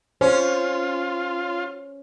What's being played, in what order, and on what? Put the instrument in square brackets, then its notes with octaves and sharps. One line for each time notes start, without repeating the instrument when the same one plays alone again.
[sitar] C#4 [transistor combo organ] F4 [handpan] C5